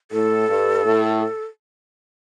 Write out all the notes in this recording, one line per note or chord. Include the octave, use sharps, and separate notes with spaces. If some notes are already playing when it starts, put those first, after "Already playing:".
A2 A4
G2
A2